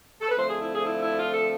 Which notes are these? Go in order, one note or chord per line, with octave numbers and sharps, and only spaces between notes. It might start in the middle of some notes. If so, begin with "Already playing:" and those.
A4
B4
D3 F3 A3 C4 C5
G#4
E4
G#4
E4
E4
F4
A4